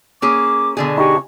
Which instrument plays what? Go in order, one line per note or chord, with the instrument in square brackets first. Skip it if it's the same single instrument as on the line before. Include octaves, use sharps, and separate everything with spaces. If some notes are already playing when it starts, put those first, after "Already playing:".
[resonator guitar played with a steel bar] A#3 C#4 G#4 [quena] D6
[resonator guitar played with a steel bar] B2 D3 G#4
[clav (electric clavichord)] D#4 G4 G#5 [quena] C#6